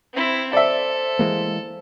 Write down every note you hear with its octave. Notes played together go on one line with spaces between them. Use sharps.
C4 E4
A4 C5 D5 E5
E3 G#3 A#3